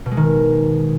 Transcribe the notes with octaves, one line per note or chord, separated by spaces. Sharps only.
B2
G#3
D#3